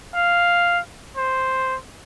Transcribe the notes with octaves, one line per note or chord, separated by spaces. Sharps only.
F5
C5